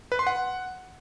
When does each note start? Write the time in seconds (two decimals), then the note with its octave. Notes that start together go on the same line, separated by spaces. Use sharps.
0.12 B4
0.19 C6
0.27 F#5